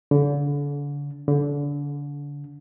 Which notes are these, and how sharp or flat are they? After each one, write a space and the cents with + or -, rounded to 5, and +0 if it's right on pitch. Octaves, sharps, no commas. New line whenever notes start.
D3 -35
D3 -30